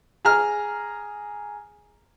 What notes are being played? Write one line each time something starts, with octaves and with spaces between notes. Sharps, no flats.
G#4 A#5 F6